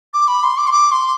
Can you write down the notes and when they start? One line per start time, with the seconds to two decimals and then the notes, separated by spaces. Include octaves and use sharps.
0.14 D6
0.28 B5
0.43 C6
0.57 D6
0.67 C6
0.72 D6
0.92 C6